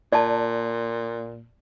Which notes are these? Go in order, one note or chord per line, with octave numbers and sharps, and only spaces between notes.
A#2 D5 A5